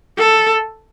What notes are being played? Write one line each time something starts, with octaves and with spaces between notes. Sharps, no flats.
A4